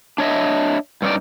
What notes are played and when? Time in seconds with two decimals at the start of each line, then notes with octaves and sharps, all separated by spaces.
0.18 D4 C#5 D#5 E5
1.02 G2 C#4 D#4 D5